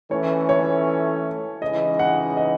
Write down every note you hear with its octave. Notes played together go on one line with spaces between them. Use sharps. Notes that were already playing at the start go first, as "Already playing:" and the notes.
E3 A3 C#4 C#5
C#5
C#3 E3 G#3 D#4 D#5
F#5
D#5